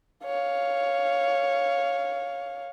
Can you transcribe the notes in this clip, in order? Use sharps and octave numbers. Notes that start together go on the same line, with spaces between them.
C#5 F5